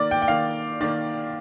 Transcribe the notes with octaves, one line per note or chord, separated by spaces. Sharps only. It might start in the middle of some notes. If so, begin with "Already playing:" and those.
Already playing: D#3 A#3 D5
G5
G5
D#3 A#3 F5
D#3 A#3 D5